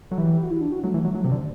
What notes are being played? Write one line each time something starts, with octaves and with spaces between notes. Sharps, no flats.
F#3 A4
E3 G4
F#4
E4
D4
F#4
F#3 A3
E3
F#3
F#3
C3
D3